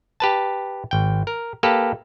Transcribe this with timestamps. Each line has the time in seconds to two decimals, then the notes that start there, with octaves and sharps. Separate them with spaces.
0.20 G4 B4 A5
0.91 G#1 G5
1.27 A#4
1.63 A#3 G4 A4 B4